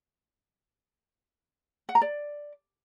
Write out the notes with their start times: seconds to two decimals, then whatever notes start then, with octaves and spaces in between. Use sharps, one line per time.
1.89 F#5
1.95 A#5
2.01 D5